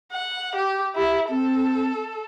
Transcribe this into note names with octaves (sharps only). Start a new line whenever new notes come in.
F#5
G4
E4 G4
C4 A4